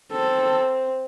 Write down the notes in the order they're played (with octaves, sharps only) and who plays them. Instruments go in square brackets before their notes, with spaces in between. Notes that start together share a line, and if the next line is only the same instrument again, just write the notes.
[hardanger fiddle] C4 [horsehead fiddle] A4